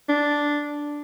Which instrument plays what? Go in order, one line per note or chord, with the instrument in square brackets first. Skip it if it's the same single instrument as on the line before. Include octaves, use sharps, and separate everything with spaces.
[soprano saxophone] D4